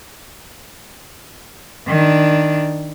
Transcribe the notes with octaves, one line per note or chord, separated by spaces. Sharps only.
D#3 D4